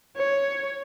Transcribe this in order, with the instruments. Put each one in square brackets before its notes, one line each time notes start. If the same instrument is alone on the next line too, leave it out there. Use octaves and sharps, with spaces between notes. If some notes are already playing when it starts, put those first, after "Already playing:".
[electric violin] C#5